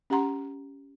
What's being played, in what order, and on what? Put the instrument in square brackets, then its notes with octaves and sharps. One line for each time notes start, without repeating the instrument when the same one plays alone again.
[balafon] C#4 G4 F#5 A#5 C6